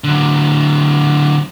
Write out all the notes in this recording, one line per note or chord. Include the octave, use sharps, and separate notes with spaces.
D3 F#3